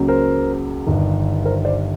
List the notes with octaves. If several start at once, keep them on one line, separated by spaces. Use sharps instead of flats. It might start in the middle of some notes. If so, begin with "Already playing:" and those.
Already playing: C#2 C#3 F#3 A#3
A#4 C5
G1 G2 D#3
A#4 C5
C5 D5